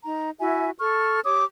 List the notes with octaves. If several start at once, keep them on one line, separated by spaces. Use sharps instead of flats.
D#4 A#5
E4 F#4 E5 G#5
A4 C#6 F6
G4 C#5 D6 D#6